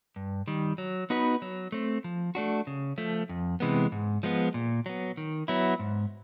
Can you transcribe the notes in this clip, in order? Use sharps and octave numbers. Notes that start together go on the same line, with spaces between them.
G2
D#3 G3
F#3
B3 D#4 F#4 B4
F#3
A3 C4
F3
A3 D4 F#4
C#3
F3 A3
F2
C3 E3 G#3 B3
G#2
F3 G#3 B3
A#2
F#3 B3
D#3
F#3 B3 E4
G#2